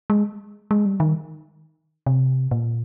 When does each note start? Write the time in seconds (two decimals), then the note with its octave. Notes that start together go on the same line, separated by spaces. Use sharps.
0.10 G#3
0.71 G#3
0.85 G3
1.00 D#3
2.06 C3
2.51 A#2